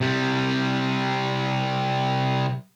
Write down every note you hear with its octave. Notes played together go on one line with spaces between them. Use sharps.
C3 G3